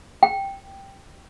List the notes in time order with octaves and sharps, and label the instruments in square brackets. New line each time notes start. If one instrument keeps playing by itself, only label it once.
[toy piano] G5